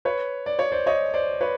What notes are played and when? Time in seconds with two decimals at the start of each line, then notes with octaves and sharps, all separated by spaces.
0.05 B4 C#5
0.46 D5
0.59 C#5
0.72 C5 D5
0.86 C#5 D#5
1.14 C5 D5
1.41 B4 C#5